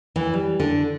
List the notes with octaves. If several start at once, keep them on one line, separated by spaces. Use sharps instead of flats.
E3
G3
D3